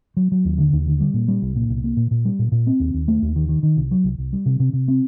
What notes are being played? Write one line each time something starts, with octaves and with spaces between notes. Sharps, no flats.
F#3
F#3
D#2
D3
D#2
D3
G3
A#2
G3
C2
A#2
C2
A#3
A#2
A#2
G3
A#2
A#2
C4
D#2
D#2
A3
D#2
D#3
D#3
D#3
C2
F#3
C2
C2
G3
C3
C3
C3
C4